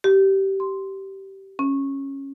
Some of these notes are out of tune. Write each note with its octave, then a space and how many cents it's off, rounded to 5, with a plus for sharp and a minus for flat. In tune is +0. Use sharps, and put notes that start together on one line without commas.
G4 -20
C6 -5
C#4 -15